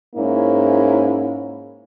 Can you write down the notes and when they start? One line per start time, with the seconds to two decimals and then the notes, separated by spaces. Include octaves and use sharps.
0.16 G#2 A#3 C#4 E4